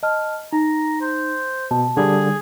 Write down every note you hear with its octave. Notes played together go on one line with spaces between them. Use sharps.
D#5 A5 F6
D#4 A#5
C5
B2 A5
D3 G3 G#4